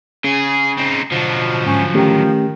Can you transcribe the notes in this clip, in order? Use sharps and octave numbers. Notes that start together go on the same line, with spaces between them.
C#3 G#4
C4 D#4
B2 D3 F3 F#3
G#2 C#4
D#3 A3 C#4 G4